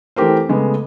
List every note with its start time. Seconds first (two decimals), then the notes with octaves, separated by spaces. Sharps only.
0.16 E3 A3 C4 G4 A#4 C5
0.49 C#3 G#3 A3 B3